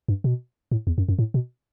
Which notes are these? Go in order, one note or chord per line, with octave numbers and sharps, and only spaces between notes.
G2
B2
A2
E2
F#2
F#2
A2
B2